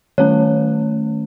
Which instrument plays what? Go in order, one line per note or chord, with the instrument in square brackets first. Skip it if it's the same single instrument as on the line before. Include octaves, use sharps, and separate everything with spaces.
[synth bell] D#3 A3 C#4 [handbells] C#5